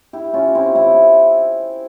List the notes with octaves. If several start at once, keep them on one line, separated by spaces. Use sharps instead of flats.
E4 G4
C#4 F4
C4 E4
C4 E4